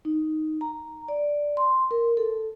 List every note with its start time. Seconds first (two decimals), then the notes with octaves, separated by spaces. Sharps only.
0.05 D#4
0.61 A#5
1.08 D5
1.57 C6
1.91 A#4
2.17 A4